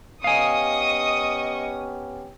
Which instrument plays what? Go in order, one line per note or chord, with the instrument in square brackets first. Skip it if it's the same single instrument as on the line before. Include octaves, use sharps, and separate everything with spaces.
[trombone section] B3 C#4 G4 [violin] D#5 C#6 [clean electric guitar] F5 G#5 [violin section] D#6